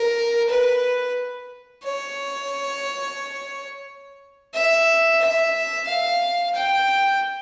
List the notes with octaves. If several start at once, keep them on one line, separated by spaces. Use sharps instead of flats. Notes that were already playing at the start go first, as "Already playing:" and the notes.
Already playing: A#4
B4
C#5
E5
E5
F5
G5